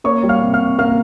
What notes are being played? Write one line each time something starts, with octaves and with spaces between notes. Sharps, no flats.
A#3 C#5 C#6
G3
F5 F6
C3
F5 F6
C3
A#3 F5 F6